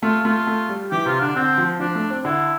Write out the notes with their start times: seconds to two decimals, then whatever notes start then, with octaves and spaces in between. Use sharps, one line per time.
0.03 A3 F4
0.25 A3 F4
0.47 A3
0.69 G3
0.91 E3 G4
1.06 C3 F4
1.21 D3 D4
1.36 D3 C4
1.58 F3
1.80 F3 D4
1.95 A3
2.10 C4
2.24 D3 E4